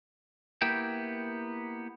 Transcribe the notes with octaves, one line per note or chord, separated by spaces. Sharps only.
A#3 B3 E4 G4 G5